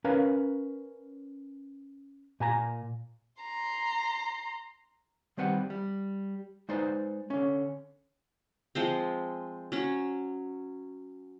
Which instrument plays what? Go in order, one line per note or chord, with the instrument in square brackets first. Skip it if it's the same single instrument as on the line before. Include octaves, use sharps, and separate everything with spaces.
[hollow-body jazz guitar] C#4 A#4 B4 F5 A#5
A#2 G#5 A#5
[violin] A#5 C6
[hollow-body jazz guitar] D#3 G3 C4 B4 F#5
G3
G#3 D#4 B4 C5 D5
D3 C#4
[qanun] F3 G#3 C4
F#3 C#4